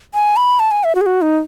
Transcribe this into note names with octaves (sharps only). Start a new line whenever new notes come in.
G#5
B5
A5
G#5
E5
F#4
G#4
F#4
D#4